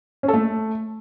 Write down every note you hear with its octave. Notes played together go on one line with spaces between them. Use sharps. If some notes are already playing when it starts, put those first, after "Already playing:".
C#4
A4
A3